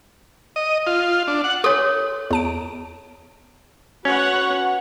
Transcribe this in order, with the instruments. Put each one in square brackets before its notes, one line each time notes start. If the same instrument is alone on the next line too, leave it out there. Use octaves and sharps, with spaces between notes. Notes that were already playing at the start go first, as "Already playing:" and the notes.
[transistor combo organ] D#5
F4
D4
F#5
[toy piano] A4 C#5 [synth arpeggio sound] C6 D6
[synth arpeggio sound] E2 A5 D7
[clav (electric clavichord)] C#4 [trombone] F#4 [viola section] B4 C#5 F#5